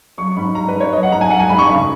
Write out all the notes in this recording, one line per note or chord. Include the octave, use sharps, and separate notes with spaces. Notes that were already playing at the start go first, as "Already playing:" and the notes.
F#3 C#6
G#2 B5
F#3 A#5
B4
G#2
C#5
F#3 D#5
F#5
G#2 A#5
G#5
F#3 F#5
G#5
G#2 B5
C#6
C#3 B5